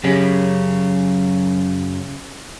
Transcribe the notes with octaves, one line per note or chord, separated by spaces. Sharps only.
F#2 C#3 G4 B5